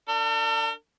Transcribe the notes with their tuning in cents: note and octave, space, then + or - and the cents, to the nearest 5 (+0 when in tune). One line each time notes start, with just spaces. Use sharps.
D4 +5 A4 +45